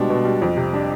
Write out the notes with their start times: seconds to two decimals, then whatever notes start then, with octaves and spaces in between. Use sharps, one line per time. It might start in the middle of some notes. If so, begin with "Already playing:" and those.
Already playing: B2 G3 G#3 D4
0.10 B2
0.25 G3
0.42 F2
0.57 C3
0.73 G3 D4